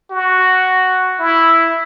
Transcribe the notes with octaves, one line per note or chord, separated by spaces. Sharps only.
F#4
E4